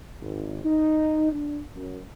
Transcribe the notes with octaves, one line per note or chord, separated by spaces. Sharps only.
G#1
D#4
D4
F#2